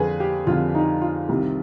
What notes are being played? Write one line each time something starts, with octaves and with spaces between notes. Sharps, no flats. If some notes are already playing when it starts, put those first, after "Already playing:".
Already playing: F2 D3 G#4 B4
G4
F2 D3 F4
D#4
F4
C2 C3 D#3